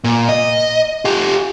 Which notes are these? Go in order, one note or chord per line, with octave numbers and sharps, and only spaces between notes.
A#2
D#5
F4 G4